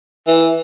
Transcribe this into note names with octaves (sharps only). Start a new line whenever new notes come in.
E3